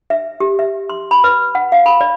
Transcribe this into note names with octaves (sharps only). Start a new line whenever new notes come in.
E5
G4
E5
C6
B5
B4
F#5
F5
B5
D5